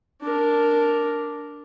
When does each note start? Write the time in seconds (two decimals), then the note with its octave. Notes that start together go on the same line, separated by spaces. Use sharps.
0.22 D4 A#4